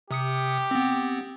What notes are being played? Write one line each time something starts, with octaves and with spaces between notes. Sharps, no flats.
C3 G4 D#6 C#7
B3 C4